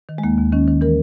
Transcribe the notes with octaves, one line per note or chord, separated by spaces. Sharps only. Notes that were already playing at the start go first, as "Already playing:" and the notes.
D#3
G#3
D#2 A#3
D#2
D#3 C#4
D#3
E3 A#4